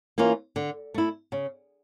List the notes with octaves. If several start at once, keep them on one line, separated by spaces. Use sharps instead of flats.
E3 A#3 C#4 F4
D3
A3 E4
C#3